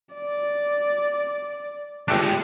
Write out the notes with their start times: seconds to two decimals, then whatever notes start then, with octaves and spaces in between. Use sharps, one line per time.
0.15 D5
2.08 G1 G#3 A3 D4 G4